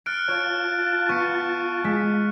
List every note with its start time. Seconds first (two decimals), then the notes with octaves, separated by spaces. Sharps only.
0.06 F6 F#6 A6 C#7 D7
0.28 F4 C#5 A5
1.09 B3 C#6 F#6 C#7
1.84 G#3 B6